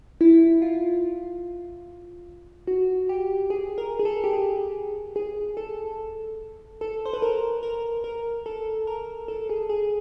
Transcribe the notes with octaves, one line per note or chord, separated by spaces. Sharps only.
E4
F4
F#4
G4
G#4
A#4
G#4
A4
G4
G#4
G#4
A4
A4
C5
B4
A#4
A#4
A#4
A4
A#4
A4
G#4
G#4